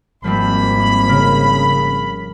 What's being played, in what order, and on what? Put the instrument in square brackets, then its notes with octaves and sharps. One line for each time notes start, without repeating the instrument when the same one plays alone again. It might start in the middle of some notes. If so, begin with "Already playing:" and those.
[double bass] G#1 A#3 [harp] F3 G3 C4 [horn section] B5
[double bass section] C#3 [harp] A#4